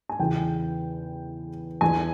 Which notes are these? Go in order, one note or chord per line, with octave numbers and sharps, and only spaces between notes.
G#5
E2 C#3 E3 G5
E2 E3 G#5